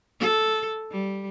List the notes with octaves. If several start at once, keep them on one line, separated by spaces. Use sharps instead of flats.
A4
G3